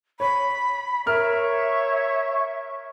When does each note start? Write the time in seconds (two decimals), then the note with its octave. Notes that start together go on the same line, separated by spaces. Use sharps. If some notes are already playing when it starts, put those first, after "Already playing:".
0.20 C#5 B5
1.06 A#4 C#5 E5 F6